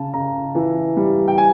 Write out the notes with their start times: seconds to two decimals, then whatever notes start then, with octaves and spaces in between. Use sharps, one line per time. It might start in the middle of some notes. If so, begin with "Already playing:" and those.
Already playing: C#3 A5
0.14 C#3 A#5
0.55 E3
0.97 G3
1.28 G5
1.38 G#5